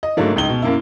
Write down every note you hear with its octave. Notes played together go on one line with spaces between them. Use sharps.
D#5
G#2 D3 F#3 A3 A#3
C#2 D#4 G7
B2
F#2 A#3 E4